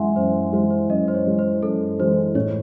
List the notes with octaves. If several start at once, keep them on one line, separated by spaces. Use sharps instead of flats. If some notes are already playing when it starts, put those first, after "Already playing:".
Already playing: F#2 E3 G#3 E5 F#5 G#5 C6
F#2 C5
E3 G#3 C5
C5
F#2 D#5
C5
C#5
E3 G#3
C5
F#2 A4
E3 G#3 C5
A2 C#5